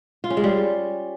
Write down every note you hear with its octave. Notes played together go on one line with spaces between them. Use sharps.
F4
C#4
G#3
G3